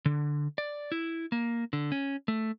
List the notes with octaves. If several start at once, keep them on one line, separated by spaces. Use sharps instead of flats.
D3
D5
E4
A#3
D3
C#4
A3